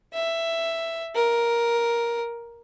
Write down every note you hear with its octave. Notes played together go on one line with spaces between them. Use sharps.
E5
A#4